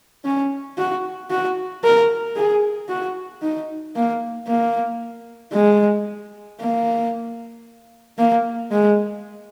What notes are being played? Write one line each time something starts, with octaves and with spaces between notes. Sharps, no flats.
C#4
F#4
F#4
A#4
G#4
F#4
D#4
A#3
A#3
G#3
A#3
A#3
G#3